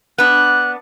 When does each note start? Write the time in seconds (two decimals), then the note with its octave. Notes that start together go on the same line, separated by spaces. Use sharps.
0.18 B3 D4 F#6